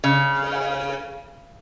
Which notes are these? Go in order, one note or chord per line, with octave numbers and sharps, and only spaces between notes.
C#3